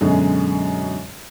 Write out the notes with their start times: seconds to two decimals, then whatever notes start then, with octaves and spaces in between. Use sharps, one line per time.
0.01 F#2 B2 D3 G#3